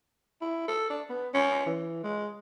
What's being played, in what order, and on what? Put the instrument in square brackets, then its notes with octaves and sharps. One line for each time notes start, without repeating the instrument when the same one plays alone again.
[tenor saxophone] E4
A4
D4
B3
C#4
E3
G#3